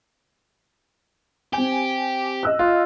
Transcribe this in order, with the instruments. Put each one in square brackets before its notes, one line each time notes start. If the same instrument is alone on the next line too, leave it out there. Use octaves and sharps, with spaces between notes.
[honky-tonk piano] C4 G#5 [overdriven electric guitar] G4
[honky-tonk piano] D#5 E6 F#6
[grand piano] F4